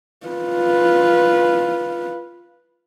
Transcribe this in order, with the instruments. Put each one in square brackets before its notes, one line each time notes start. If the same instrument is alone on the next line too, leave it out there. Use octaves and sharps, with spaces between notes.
[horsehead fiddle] F4 B4